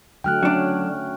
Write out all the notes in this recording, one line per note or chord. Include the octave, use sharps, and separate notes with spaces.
D3 F#3 A3 G5 F6 F#6
F#3 C#4 D4